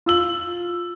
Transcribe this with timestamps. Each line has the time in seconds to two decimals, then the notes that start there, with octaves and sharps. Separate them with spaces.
0.06 F4 E6 F#7